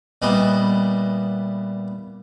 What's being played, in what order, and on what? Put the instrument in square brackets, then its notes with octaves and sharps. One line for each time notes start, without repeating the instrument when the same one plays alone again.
[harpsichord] A#2 G3 B3 E4 D#5